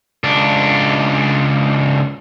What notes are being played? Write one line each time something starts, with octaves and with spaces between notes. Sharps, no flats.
C#2 D4